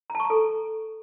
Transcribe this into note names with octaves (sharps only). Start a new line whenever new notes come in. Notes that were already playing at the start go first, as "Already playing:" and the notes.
A#5
A5
C#6
A#5
A4